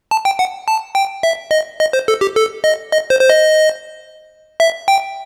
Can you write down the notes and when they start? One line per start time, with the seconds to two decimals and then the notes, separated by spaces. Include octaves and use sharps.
0.11 A5
0.25 G5
0.39 F#5
0.68 A5
0.95 G5
1.23 E5
1.51 D#5
1.80 D#5
1.93 C5
2.08 A4
2.21 G4
2.36 A4
2.64 D#5
2.92 D#5
3.10 C5
3.21 C5
3.30 D#5
4.60 E5
4.88 G5